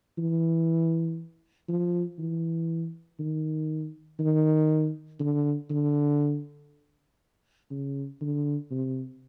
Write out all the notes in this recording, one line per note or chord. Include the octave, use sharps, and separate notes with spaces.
E3
F3
E3
D#3
D#3
D3
D3
C#3
D3
C3